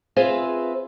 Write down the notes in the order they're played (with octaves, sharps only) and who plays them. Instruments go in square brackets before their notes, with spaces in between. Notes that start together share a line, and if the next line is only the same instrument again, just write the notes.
[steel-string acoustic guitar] C4 F4 G#4 B4 E5 F5